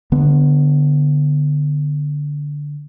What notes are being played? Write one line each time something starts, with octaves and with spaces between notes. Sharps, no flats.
D3 B3